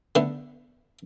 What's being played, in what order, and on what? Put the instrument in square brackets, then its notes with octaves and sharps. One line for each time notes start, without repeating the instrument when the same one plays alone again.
[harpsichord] D3 A3 B3